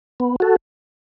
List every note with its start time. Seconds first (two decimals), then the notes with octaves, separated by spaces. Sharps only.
0.20 B3
0.40 F#4 A4